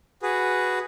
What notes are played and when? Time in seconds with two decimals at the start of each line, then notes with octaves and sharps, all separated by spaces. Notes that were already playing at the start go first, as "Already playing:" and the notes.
0.23 F#4 G#4 B4